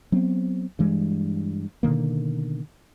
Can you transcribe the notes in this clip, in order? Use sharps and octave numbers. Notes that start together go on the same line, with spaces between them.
F#3 B3 C4
G2 E3 G#3
B2 D3 D#3 A#3